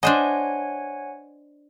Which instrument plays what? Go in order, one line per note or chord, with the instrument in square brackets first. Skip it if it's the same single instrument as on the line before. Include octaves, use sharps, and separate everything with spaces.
[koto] D4 C5 D#5 [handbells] C#5 F#5 G#5